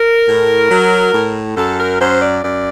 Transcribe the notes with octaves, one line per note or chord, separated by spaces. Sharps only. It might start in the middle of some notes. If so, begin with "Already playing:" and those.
Already playing: A#4
A2
F#3
A2
F#2 A4
A#4
F#2 C5
D5
F#2 D5